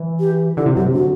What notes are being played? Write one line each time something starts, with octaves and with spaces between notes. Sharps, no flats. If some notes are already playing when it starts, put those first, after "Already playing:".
Already playing: E3
G4
D3 E4
C3
F#2 G4
C3
D3 F#4